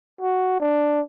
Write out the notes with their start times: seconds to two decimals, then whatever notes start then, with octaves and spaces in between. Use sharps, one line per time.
0.21 F#4
0.60 D4